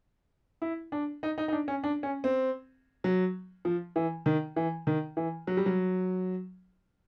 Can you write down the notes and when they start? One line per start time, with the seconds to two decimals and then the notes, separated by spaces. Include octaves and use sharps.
0.62 E4
0.92 D4
1.23 D#4
1.38 D#4
1.48 D#4
1.52 D4
1.68 C#4
1.84 D4
2.03 C#4
2.24 C4
3.04 F#3
3.65 F3
3.96 E3
4.26 D#3
4.56 E3
4.87 D#3
5.17 E3
5.47 F#3
5.57 G3
5.66 F#3